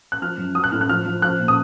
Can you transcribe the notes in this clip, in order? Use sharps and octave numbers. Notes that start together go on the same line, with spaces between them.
F#6
F3 F6
F#2
F#3 D#6
F#6
A2 F6
F#6
F3 F6
F3
F3 F#6
A#2
D#6